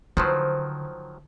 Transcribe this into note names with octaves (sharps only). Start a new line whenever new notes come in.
D3 D#3 F3 F#3 B4 C5